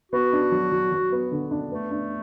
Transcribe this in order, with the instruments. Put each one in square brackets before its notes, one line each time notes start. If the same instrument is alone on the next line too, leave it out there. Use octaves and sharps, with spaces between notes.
[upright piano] B3 [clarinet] F#4
[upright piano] D4
F#3
F#3
F#3
B3
D3
D4
[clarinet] A3 [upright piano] B3
[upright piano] D4